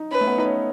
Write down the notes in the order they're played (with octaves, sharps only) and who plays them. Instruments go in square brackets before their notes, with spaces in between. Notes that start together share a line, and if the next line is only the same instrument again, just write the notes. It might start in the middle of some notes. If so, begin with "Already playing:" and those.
Already playing: [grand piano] D#4
[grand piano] C#4 [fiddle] B4
[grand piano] A3
B3
D#4
C#4